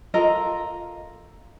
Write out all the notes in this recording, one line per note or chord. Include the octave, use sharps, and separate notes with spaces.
F4 A4 A#4 D#5